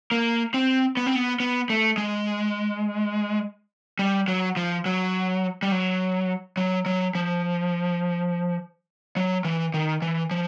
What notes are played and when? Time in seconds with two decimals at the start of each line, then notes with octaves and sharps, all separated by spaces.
0.11 A#3
0.54 C4
0.97 B3
1.06 C4
1.16 B3
1.40 B3
1.70 A3
1.98 G#3
3.99 G3
4.28 F#3
4.57 F3
4.85 F#3
5.62 G3
5.71 F#3
6.57 F#3
6.86 F#3
7.15 F3
9.16 F#3
9.45 E3
9.74 D#3
10.02 E3
10.31 F3